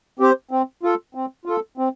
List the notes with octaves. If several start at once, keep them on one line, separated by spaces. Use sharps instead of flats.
C4 G4 C5
C4
F4 A4
C4
F4 A4
C4